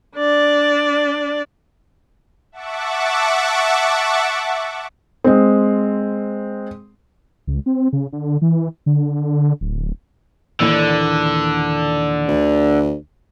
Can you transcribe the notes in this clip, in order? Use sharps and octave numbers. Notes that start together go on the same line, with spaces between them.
D4 D5
E5 F#5 A5 C#6 D6
G#3 C4
C#2
C4
C#3
D3
E3
D3
D1
D#2 A#2 D3 E3
D2